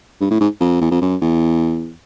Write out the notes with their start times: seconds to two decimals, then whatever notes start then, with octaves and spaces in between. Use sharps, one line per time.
0.20 G2
0.31 A2
0.41 G#2
0.61 F2
0.81 E2
0.91 F2
1.01 F#2
1.22 E2